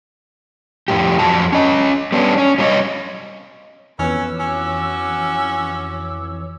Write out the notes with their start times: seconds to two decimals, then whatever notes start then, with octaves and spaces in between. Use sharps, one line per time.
0.88 F2 A2 G4
1.19 F2 F#3 A5
1.52 C#4 D#5
2.12 G3 B3 C#4 D4
2.38 C#4
2.58 F#3 G3 D4 F4 C#5 D#5
3.99 F2 E3 B3 C#4 B4 C#5 E6
4.40 C#4 F#4 D6